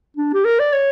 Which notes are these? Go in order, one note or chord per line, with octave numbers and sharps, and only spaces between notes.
D4
G4
A#4
D5
C#5